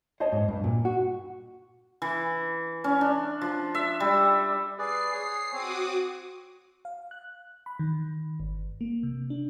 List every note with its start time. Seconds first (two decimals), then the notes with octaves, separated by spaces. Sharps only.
0.20 C5 C#5 D#5 A5
0.32 G#2
0.48 G2
0.64 A#2
0.85 F#4
2.02 E3
2.84 C#4
3.01 D4
3.41 F3
3.75 E5
4.00 G3
4.78 G#4 B4 D5 C7
5.14 G#4 C#5
5.53 C4 F#4 C#5 D6 D#6
6.85 F5
7.11 F#6
7.66 B5
7.79 D#3
8.40 G1
8.81 A#3
9.03 C3
9.30 D4